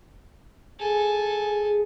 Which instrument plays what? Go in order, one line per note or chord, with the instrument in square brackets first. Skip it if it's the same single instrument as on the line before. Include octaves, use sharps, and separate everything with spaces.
[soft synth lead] G#4 [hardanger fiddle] A4 G#5